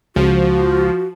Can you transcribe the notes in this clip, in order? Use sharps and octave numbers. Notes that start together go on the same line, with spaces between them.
C#2 F3 F#4